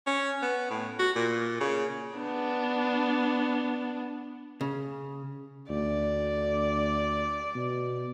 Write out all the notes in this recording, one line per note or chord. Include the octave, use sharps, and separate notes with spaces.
C#4
B3
A2
F#4
A#2
C#3
B3 D4
C#3
D2 D5
B2